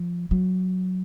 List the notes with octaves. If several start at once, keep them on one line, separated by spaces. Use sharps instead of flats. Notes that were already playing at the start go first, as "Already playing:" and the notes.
Already playing: F3
F#3